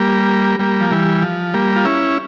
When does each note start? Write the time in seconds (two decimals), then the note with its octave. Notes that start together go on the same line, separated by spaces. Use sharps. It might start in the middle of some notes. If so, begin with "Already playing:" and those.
Already playing: G3 A#3
0.59 G3 A#3
0.81 F3
0.91 E3 G3
1.22 F3
1.54 G3 A#3
1.76 F4
1.85 C#4 E4